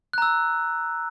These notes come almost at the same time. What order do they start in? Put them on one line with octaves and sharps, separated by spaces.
F#6 A#5 E6